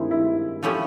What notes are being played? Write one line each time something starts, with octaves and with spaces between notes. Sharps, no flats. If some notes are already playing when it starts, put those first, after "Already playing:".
Already playing: G2 D#3 G#3 C4 D#4 E4
E4
F3 A3 C#4 E4 G4